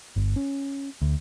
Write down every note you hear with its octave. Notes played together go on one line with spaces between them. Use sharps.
G1
C#4
D2